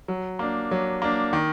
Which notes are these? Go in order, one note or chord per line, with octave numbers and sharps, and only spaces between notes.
F#3
A#3 D4
F#3
A#3 D4
D#3